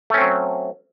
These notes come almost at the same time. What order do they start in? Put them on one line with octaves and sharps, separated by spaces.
A3 C#4 C4 F#3